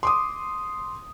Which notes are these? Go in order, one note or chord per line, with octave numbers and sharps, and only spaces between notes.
C6 D6 D#6